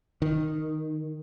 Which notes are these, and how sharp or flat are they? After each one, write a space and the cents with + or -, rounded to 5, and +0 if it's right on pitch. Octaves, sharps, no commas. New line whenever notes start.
D#3 -5